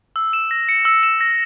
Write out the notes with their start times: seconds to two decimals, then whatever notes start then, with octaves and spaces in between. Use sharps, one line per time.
0.16 E6
0.33 E7
0.51 A#6
0.69 C#7
0.85 E6
1.03 E7
1.21 A#6